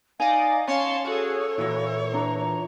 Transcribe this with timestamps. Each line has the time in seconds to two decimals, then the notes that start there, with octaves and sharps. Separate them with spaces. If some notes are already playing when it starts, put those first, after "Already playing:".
0.20 D#4 D5 D#5 F5 G#5
0.68 C#4 C#5 F5 A5 C6
1.07 F#4 G#4 A4 C#5
1.58 A#2 E3 E4 F#4
2.14 D4 A#5